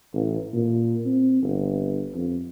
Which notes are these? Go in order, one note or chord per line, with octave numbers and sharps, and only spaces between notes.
A1
A#2
C4
G1
F2